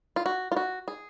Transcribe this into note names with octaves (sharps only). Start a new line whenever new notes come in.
F4
F#4
F4
F#4
G#4